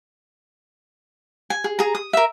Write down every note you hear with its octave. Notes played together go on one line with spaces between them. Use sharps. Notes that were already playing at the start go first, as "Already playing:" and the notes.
G#5
G#4
G#4 A#5
D#6
A#4 E5